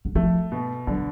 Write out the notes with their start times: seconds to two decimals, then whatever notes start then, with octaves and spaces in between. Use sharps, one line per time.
0.05 D3
0.15 F3 A3
0.52 B2
0.87 D3 F#3